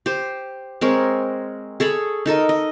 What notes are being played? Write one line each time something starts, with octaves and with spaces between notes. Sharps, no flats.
G4 C5
G#3 C4 A#4 C#5
G#4 A4 C#5 B5
D#4 A4 A#4 D#5
D#5